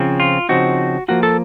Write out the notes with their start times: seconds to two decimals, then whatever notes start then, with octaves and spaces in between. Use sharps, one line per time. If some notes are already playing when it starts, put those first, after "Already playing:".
Already playing: C#3 F3 C4
0.20 F4
0.49 C#3 F3 C4 D#4 F#4
1.08 F3 A#3 F4 F#4
1.23 A4